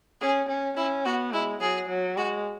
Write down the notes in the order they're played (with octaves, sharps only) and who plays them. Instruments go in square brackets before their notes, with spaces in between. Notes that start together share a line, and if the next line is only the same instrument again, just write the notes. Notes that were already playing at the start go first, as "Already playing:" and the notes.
[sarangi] C#4 [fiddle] G#4
[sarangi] C#4
[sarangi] C#4 [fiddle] E4
[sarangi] B3 [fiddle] F#4
[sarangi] G#3 [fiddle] E4
[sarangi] F#3 [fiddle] G#4
[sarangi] F#3
[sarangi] G#3 [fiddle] F#4